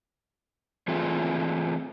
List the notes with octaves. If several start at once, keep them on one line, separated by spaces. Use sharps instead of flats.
E3 A3 C4 F4 G#4